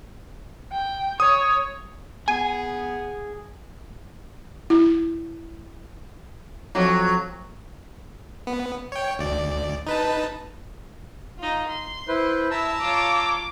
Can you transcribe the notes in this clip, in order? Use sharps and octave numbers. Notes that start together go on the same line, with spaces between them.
G5
C#5 D#6
B3 G#4 G#5
E4
F2 F#3
B3
C#5 G5
D2 D5
D#4 B4 A5
D#4 F4
C6
E4 B4 C5
E4 E5 A5 A#5 E6
F4 C#5 D6